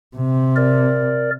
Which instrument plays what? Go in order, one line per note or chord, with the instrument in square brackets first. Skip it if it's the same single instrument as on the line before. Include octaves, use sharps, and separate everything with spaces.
[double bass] C3
[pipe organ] A#4 D5